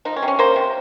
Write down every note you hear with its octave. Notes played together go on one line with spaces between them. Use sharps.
F3 D#4
C#4
C3
C#4
A#3 C5
C3